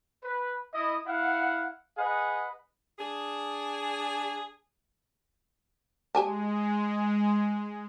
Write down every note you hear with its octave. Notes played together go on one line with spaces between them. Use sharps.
B4
E4 D#5
E4 F5 F#5
G#4 B4 D#5 F#5
D4 G#4
G#3 G4 G#5 A5